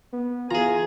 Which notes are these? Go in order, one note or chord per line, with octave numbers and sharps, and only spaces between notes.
B3
E3 F4 G#4 G#5 A#5